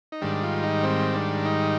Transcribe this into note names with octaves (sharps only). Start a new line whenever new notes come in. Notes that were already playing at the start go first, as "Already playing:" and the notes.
D#4
G#2 D#3 G3 D4
F4
D#4
C4
D4
D#4